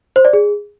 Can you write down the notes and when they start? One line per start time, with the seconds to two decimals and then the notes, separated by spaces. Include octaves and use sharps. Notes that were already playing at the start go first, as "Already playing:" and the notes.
0.16 C5
0.25 D5
0.33 G#4